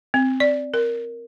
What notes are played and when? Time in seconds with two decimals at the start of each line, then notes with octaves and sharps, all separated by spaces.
0.14 C4
0.40 D5
0.74 A#4